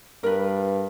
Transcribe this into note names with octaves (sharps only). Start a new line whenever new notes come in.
G2 A#4 B4